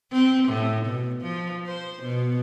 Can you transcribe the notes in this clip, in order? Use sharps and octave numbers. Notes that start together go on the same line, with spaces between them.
C4
A2
B2
F3
C5
B2